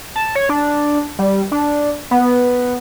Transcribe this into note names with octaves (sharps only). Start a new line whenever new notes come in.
A5
C#5
D4
G3
D4
B3